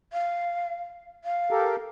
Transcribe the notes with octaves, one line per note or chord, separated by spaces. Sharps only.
F5
F5
G4 A4 A#4